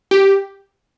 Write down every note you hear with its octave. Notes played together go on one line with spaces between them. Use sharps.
G4